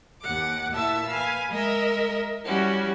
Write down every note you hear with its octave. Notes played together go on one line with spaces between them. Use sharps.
D#2 F#5 D6
A#2 E4 E5 A5 E6
B4 F5 G#5
G#3 A#4 D#5 E5
G3 C#4 E4 F#4